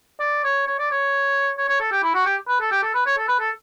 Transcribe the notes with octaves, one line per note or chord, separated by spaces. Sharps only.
D5
C#5
C#5
D5
C#5
C#5
C#5
A4
G4
E4
F#4
G4
B4
A4
G4
A4
B4
C#5
A4
B4
A4